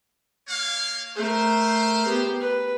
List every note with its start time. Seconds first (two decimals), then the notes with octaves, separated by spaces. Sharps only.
0.47 A#3 C#5 F5
1.16 A3 A#4 C5
2.06 B3 G4
2.40 B4